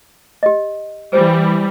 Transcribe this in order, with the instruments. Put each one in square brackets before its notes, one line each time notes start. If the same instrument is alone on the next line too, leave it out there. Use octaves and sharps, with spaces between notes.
[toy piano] G4 D#5
[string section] E3 G3 [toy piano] C5